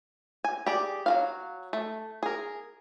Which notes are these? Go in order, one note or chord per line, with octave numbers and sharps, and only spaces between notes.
G#5
G4 G#4 D5
F#3 F4 F5
A3
G#4 A#4